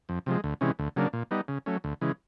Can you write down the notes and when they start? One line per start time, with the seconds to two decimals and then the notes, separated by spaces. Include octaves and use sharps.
0.09 F2
0.26 C3 F3 G#3
0.44 D2
0.61 C3 E3 G#3 C#4
0.79 D2
0.96 C#3 F#3 A#3 D4
1.13 A#2
1.31 G3 B3 D#4
1.48 C#3
1.66 F#3 A3 C#4
1.84 D2
2.01 C#3 E3 G#3